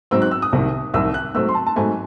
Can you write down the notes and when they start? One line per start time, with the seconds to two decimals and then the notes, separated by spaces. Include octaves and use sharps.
0.11 G#2 F#3 C4 E6
0.22 F#6
0.31 E6
0.42 D#6
0.52 C2 C3 D#3
0.94 C2 C3 D#3 E6
1.14 F#6
1.34 G#2 F#3 A3 C4 E6
1.49 C6
1.55 A5
1.67 A5
1.76 G#2 F#3 A3 C4 G#5